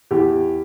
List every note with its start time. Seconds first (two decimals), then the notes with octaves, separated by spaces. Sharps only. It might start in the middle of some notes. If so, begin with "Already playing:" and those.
0.11 E2 G4